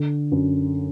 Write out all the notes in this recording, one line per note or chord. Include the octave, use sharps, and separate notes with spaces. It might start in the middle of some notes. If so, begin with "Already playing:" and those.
Already playing: D3
F#2